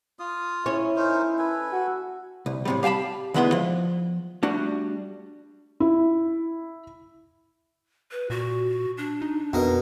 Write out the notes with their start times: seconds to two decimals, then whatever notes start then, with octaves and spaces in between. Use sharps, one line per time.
0.19 F4 D#6
0.66 C#4 E4
0.96 D#4 A#4 C5
1.38 A4 B4 G#5
1.72 F#4
2.46 C2
2.65 A2 C3 G3
2.83 G4 F5 G#5 A5 B5
3.34 D2 D#3 G#3 B3 E4 C6
3.52 F3
4.43 G3 A3 D4 F#4
5.80 E4
8.11 B4
8.30 A#2 F#4
8.98 D4
9.22 D#4
9.53 F2 B2 A#4 D#5